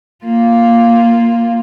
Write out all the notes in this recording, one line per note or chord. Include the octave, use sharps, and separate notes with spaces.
A#3 F4